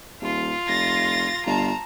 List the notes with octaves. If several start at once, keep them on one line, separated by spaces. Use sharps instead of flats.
D#1 F4
F1 A6 A#6
G1 A5 A#5